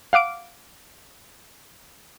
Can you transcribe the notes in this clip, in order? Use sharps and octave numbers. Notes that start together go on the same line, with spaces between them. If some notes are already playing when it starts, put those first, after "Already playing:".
F5 F#5 D6 D7